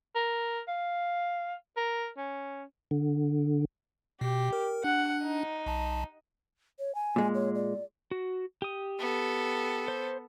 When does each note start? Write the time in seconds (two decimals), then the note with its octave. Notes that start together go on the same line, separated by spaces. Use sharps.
0.15 A#4
0.68 F5
1.77 A#4
2.17 C#4
2.91 D3
4.21 B2 G4
4.53 A#4
4.84 D4 F#5
5.23 D#4
5.66 B1 A5
6.79 C#5
6.95 G#5
7.16 A#2 G#3
7.35 C#5
7.55 D5
8.11 F#4
8.62 G4 D#6
8.99 B3 A4
9.88 C5